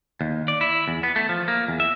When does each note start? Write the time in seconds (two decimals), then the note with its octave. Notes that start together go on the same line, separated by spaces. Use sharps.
0.21 D#2
0.48 D5
0.61 E4
0.88 E2
1.03 B3
1.16 A3
1.29 F3
1.48 A#3
1.68 E2
1.80 E5